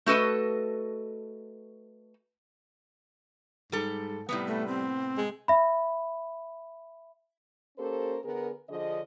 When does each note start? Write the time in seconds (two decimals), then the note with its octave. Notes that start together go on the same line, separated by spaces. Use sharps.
0.06 A3 F#4 A4 B4 D#5
3.72 G#2 G3 A4
4.29 A2 C3 G3 B3
4.47 A3
4.68 C4
5.18 G#3
5.48 E5 B5
7.78 A#3 C#4 G4 A4 A#4 C5
8.23 D3 B3 G#4 A#4
8.69 D3 F3 D4 G#4 D#5